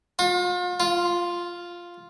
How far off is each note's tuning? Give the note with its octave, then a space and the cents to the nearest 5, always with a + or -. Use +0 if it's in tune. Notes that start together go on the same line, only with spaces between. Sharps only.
F4 +40
F4 +0